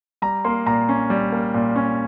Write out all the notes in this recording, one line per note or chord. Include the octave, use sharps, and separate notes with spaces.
G3 A#5
A#3 C6
A#2 A#5
C#4
G3
A#3
A#2
C#4